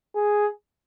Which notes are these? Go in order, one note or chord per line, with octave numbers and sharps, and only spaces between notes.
G#4